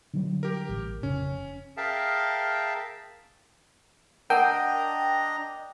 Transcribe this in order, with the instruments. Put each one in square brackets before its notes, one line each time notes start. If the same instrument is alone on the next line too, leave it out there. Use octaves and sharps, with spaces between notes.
[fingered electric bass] D3 F#3 G3
[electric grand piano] G4 A#4
[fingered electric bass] A1
[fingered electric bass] F1 C#3 [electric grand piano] C#4
[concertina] G#4 A#4 E5 F5 G5 A5
[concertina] D4 D#5 A#5 [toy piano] A#4 F#5 A5 [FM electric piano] G5